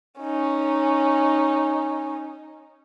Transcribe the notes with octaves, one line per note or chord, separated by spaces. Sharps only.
C#4 D#4